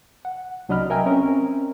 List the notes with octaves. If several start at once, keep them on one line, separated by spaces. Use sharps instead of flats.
F#5
C2 F#3 D4 D#5 B5 F6
A#4 D#5 E5 G5 G#5 A#5
C4 C#4 A#4